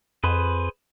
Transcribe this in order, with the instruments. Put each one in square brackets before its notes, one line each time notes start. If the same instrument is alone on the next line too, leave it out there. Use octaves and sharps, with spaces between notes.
[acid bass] F2 [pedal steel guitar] G#4 B4 C5